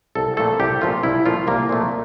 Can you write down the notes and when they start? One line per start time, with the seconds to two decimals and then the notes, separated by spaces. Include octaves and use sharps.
0.15 C2 A4
0.37 A#2 F3 A3 A4
0.60 C2 G4
0.81 A#2 F3 A3 F4
1.03 C2 E4
1.25 A#2 F3 A3 F4
1.47 C2 A#3
1.69 A#2 F3 A3